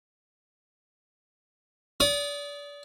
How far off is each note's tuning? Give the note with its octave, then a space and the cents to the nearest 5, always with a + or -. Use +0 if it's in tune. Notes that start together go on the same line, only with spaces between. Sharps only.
D5 -30 D#6 +0